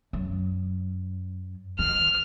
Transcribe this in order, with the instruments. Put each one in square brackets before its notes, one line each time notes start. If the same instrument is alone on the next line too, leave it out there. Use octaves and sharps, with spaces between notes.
[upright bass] F#2
[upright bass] D#3 [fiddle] F6